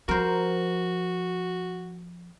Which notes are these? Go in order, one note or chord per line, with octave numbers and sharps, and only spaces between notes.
F3 F#4 A#4 C5